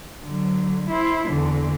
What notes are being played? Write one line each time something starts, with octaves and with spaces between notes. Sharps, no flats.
D3 F#3
E4 C5
E2 D3